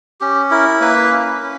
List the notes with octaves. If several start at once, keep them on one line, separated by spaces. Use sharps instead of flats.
C#4 G4
E4 A#4
A#3 B4
C#4
C#4